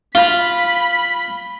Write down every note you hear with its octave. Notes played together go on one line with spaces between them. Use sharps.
F4 B5 B6